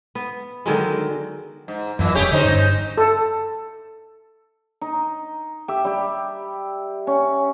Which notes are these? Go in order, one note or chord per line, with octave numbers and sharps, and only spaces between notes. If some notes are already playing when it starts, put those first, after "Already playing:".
B3
D3 D#3 F#3 G#3
G#2
F#2 A#2 E3
E1 C#4 G4 G#4
D3 C#4 D#4 C5
G2
A4
D#4
G4 E5
G3 G4
C#4